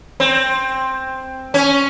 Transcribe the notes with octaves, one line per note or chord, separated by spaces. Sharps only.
C4
C#4